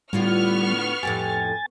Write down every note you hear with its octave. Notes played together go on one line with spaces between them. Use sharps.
A2 D3 G3 B3 F4 C#6 F6
F2 A2 G4 G#5 A6